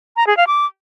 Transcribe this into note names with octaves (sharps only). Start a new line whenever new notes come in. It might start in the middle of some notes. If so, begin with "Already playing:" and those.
A#5
G#4
F5
D6